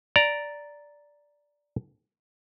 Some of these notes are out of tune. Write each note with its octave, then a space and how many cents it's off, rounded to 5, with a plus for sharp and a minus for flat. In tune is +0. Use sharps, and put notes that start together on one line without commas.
D5 -5 A#5 +0